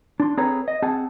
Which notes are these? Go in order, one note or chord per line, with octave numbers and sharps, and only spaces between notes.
D4 C6
C4 G#4 A4 B4 C#5 A#5
D#5
C4 G#4 F#5 A5